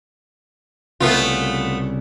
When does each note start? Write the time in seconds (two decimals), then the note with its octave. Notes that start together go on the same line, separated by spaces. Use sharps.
1.00 C2 C#3 A3 B3 F4